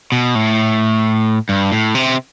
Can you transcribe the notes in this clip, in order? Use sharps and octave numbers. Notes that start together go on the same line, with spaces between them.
B2
A2
G2
A2
C3